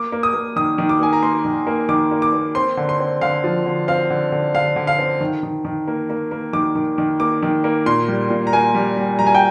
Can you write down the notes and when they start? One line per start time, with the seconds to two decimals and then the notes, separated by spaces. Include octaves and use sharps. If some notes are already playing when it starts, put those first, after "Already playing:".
Already playing: A#3 D6
0.12 A#3
0.23 D#6
0.34 A#3
0.56 D#3 D#6
0.78 D#3
0.89 D6
1.00 A#3 G#5
1.13 A#5
1.23 A#3 C6
1.45 D#3
1.67 A#3
1.89 D#3 D6
2.11 A#3
2.22 D6
2.33 A#3
2.55 C4 C6
2.77 D3
2.89 C6
3.00 C4
3.21 D3 F5
3.44 F3
3.66 D3
3.88 C4 F5
4.10 D3
4.32 D3
4.55 D3 F5
4.76 D3
4.87 F5
4.99 C4
5.20 D#3
5.43 D#3
5.65 D#3
5.88 A#3
6.10 A#3
6.31 A#3
6.53 D#3 D6
6.75 D#3
6.98 D#3
7.20 A#3 D6
7.43 D#3
7.64 A#3
7.86 A#2 C6
8.08 G3
8.30 A#2
8.47 A#5
8.53 A#3 G#5
8.75 G3
8.97 G3
9.19 G3 A#5
9.26 G#5
9.35 G5